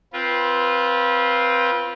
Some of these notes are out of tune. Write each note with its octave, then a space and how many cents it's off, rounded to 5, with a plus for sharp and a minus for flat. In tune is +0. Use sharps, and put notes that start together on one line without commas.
C4 +0 F4 +0 B4 -25